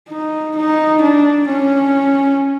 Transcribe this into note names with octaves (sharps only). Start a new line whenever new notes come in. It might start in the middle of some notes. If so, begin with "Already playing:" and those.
D#4
D#4
D4
C#4